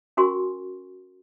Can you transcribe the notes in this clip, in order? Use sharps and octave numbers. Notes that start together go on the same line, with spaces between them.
C#4 F#4 A#4 G#5 C6 C#6